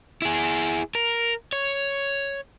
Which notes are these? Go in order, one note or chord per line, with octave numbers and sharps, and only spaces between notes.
E4 G#4
A#4
C#5